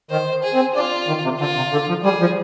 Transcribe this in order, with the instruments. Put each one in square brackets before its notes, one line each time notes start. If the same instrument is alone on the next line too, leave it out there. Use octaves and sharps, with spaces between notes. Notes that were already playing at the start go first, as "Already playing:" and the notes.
[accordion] D#3 [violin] C5
[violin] G#4
[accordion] C4
[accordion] D4 [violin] F4
[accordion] D#3
C3
[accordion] D3 [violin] F4
[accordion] C3
D3
F3
[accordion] G3 [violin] G#4
[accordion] F3